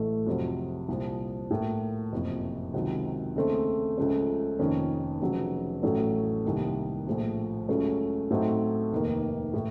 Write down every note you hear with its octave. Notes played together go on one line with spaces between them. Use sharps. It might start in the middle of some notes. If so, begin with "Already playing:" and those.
Already playing: A1 A2 A3
F2 C3 F#3
C2 A#2 F3
A2 F3 A#3
F#1 F2 C3
C#2 C3 D#3 F#3
D#2 C#3 A3 C4 D#4
C#2 C#3 F3 A3 C#4
F1 F2 D#3 A#3 C#4
F1 F2 C#3 F#3
A1 A2 F#3 A3 C#4
C2 C3 D#3 A#3
A#1 A2 F3
C#2 C#3 F#3 A3 C#4
A2 F#3 A3 C4 D#4
F1 D#2 D#3 A#3
A2